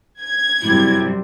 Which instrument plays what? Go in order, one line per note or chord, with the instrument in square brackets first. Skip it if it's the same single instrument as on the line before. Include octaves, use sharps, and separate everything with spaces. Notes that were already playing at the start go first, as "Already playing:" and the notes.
[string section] G#6
[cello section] F#2 C3 G3 [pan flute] E4